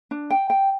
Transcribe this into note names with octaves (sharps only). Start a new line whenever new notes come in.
D4
G5
G5